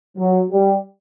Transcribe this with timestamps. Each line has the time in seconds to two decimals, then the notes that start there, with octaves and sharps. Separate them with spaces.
0.18 F#3
0.50 G3